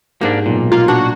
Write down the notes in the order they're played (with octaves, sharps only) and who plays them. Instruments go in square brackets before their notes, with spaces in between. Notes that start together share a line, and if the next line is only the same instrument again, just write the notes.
[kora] G#2 G4 [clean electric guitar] A#3 D4
[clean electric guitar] B1 A#2
[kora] A#3 [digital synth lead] F4
[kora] D4 [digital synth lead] F#4